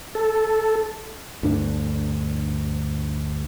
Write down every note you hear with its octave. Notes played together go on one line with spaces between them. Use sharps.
A4
D2 G2 D4